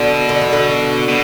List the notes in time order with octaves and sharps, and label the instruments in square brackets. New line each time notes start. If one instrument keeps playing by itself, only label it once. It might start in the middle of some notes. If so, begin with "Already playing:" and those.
Already playing: [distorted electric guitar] B2 [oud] D3
[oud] D3
E3
D3
[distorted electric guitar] B2